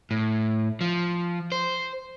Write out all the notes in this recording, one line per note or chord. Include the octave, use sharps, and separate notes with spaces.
A2
F3
C5